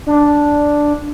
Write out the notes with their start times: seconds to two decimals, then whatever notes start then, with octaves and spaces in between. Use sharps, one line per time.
0.07 D4